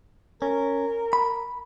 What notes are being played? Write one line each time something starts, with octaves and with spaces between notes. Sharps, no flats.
C#4 A#4
B5